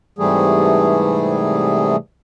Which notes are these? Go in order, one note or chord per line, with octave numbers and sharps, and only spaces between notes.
G#2 C3 E3 G3 A3 G#4